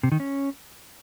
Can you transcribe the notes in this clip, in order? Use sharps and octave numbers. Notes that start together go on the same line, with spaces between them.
C3
D#3
C#4